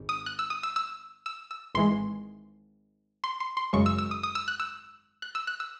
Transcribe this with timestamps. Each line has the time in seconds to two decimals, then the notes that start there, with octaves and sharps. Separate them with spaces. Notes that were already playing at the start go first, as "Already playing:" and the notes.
Already playing: G#1 G#2
0.09 D#6
0.26 F#6
0.39 E6
0.50 D#6
0.63 E6
0.76 E6
1.26 E6
1.51 E6
1.75 G#1 G#2 E3 G#3 C6
3.24 C6
3.40 C6
3.57 C6
3.73 G#1 F#2 C#3 G#3 C#6
3.86 E6
3.98 E6
4.11 D#6
4.23 D#6
4.35 E6
4.48 F#6
4.60 E6
5.22 F#6
5.35 E6
5.47 F#6
5.60 E6